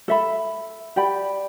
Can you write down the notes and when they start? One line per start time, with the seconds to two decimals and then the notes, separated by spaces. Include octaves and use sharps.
0.08 A4 E5 B5
0.96 G4 D5 G5 B5